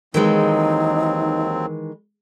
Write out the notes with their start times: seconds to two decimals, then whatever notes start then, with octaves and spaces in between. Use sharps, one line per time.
0.14 D#2 D#3 E3 F#3 G#3 C4 D#4